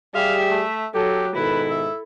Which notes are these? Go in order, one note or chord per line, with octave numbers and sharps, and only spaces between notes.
G3 G4 G#4 E5 F5
A3
F#3 G4 A4
G#2 B2 D#3 E4 A4 B4
E5